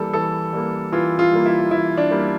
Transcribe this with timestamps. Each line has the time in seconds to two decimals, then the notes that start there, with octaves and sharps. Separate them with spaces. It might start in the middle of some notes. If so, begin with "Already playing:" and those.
Already playing: E3 G3 A#3 A4
0.14 E3 A4
0.53 G3 A#3
0.92 E3 F4
1.19 F4
1.32 G3 A#3
1.46 E4
1.71 E3 E4
1.98 D4
2.11 G3 A#3